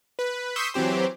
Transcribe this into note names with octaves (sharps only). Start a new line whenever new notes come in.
B4
C6 C#6 D#6 E6 G6 B6
E3 F#3 C4 G4 C5